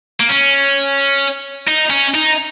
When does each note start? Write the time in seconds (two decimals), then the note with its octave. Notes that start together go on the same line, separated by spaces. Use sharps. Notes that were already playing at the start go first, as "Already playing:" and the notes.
0.20 A#3
0.29 C#4
1.68 D#4
1.90 C#4
2.14 D#4